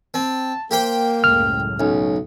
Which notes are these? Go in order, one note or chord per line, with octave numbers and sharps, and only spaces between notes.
C4 A5
A#3 G4 C5 G5
C#2 F#2 A2 F6
B1 C#4